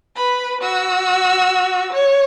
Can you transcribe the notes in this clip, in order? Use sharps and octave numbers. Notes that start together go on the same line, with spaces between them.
B4 B5
F#4 E6
C#5